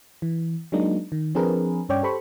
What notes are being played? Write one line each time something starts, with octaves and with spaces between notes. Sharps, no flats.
E3
F#3 G#3 A#3 D4 D#4
D#3
F3 C4 D4 G#4 A#4 B4
G2 C#4 C#5 D5 G5
G4 A4 C5 B5 C#6